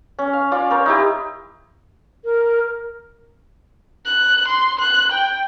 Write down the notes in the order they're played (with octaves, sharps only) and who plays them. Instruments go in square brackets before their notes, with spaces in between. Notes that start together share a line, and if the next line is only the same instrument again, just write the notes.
[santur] C#4
F5
C#4 F4 D5
A#4 C5 C#5
D#4 E4 G4
[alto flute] A#4
[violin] F#6
C6
F#6
G5